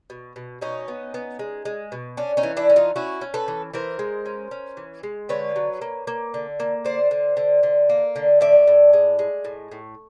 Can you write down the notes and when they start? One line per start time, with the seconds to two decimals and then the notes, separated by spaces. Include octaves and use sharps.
0.10 B2
0.36 B2
0.61 B2 C#4 D#4
0.88 B3
1.14 B3
1.39 G#3
1.65 G#3
1.92 B2
2.17 C#4 D4
2.37 C#4 D#4
2.43 E3
2.57 D4 E4
2.69 C#4
2.76 D#4 F4
2.96 C#4 E4 F#4
3.21 C#4
3.34 A4 B4
3.48 E3
3.74 E3 A#4 C5
3.99 G#3
4.26 C#4
4.51 C#4
4.77 E3
5.03 G#3
5.29 D3 B4 C#5
5.56 F#3
5.82 A#3
6.07 A#3
6.34 D3
6.60 A#3
6.85 D3 C5 D5
7.11 D3
7.37 D3
7.63 D3
7.89 A#3
8.16 D3
8.41 A2 D5 E5
8.67 A2
8.93 G#3
9.19 G#3
9.45 A2
9.72 A2